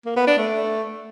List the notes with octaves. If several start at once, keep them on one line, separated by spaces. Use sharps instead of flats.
A#3
B3
D4
A3